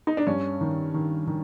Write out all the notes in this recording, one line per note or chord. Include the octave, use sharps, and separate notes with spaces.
D#4
D4
G2 C#4
D#3
D#3
D#3